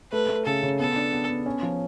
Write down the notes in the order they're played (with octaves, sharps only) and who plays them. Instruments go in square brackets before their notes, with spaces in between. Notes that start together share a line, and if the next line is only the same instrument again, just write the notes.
[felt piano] A3 [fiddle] B4
[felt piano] A3
[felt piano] C#3 [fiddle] A4
[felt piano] C#3
[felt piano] B3 [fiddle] A4
[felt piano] D4
B3
B3
C#4
F3